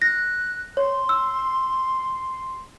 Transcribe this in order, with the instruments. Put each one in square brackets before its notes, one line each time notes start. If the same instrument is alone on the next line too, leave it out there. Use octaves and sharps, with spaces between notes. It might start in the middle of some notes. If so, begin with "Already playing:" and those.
[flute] F#6 [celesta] A#6
[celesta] C#5 [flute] C6
[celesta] E6